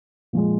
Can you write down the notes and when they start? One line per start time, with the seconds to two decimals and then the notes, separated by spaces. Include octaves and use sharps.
0.33 A#2 F3 G#3